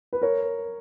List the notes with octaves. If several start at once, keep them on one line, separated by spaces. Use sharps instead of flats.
B4
A#4 C#5